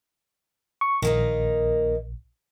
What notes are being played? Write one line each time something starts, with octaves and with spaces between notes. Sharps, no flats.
C#6
A#1 D#3 A#3 D#4